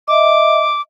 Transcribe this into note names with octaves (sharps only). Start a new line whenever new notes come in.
D#5 E5 D6